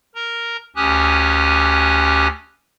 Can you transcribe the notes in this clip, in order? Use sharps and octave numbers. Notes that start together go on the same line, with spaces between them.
A#4 A#5
D2 C#4 G4 G#5 D#6 F#6